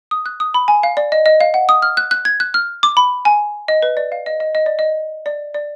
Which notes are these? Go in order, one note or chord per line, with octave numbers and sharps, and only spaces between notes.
D#6
F#6
D#6
B5
G#5
F5
D5
D#5
D#5
F5
F#5
D#6
F6
F#6
F#6
G#6
F#6
F6
D6
B5
G#5
D#5
B4
D5
F5
D#5
D#5
D#5
D5
D#5
D5
D5